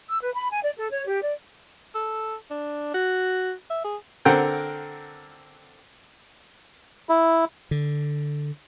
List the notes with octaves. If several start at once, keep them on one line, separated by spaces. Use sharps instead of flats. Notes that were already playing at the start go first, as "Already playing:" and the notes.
E6
B4
B5
G#5
D5
A4
C#5
G4
D5
A4
D4
F#4
E5
G#4
D3 C4 A#4 F#5 G5
E4
D3